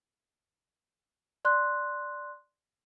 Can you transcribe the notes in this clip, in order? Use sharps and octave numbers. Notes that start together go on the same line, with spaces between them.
D5 C6 F#6